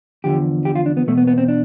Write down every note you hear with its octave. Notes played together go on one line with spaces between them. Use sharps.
E2 D3 F3 G4
G4
F4
D4
B3
E2 B2 A3
B3
B3
C4
D4